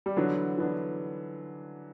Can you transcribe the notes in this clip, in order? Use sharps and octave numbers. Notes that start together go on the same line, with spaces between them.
G3
D3 E3 F#3 B3 D4
E3 B3 D4